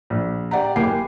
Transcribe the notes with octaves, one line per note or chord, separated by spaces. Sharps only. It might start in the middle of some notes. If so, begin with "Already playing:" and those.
A#1
G4 D5 F#5 A#5
F#1 A#3 G4 G#5 D6 C7